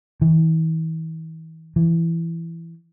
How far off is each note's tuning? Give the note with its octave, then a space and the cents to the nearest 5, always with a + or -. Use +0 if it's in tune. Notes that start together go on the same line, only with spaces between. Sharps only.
E3 -40
E3 +15